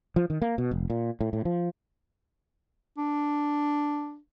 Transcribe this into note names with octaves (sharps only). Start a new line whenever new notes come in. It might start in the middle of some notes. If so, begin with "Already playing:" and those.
F3
D#3
A#3
B2
F1
A#2
A2
A2
F3
D4